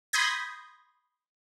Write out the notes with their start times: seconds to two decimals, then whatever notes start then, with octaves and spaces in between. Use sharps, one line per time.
0.13 B5 C6 D#6 G6 G#6 A#6